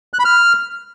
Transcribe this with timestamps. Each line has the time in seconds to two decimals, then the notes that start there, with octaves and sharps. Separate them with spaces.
0.14 F#6
0.19 B5
0.25 F6